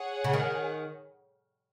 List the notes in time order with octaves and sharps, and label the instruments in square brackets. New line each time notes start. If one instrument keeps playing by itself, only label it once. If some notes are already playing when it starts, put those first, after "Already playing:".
Already playing: [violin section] G#4 C#5 F#5
[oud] C#3
D#3